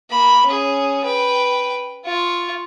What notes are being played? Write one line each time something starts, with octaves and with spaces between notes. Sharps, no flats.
A#3 B5
C#4 G#4
B4 G5
F4 C#6